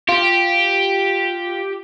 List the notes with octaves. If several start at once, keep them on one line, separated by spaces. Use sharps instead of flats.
F4 G4